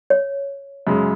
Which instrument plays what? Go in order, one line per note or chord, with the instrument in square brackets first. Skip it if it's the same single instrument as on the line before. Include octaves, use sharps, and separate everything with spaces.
[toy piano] C#5
[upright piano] F#2 C#3 G#3